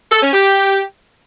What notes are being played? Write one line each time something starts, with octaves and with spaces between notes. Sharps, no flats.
A4
C#4
G4